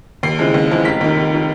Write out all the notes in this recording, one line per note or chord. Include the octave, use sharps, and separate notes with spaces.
D#2 C7
C#3 E3 G#3 C4
D#2
C#3 E3 G#3 C4
F1 B6
D#2 D#3
F1
D#3